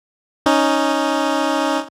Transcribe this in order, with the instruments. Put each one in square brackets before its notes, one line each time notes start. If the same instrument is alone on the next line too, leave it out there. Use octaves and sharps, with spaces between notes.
[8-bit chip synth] C#4 D#4